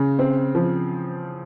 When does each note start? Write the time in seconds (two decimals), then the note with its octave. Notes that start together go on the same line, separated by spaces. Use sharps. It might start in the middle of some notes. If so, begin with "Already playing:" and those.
Already playing: C#3
0.19 C4
0.55 F3